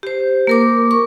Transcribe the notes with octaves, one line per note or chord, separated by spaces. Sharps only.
G4 C5
A#3 A#4 D6
C#6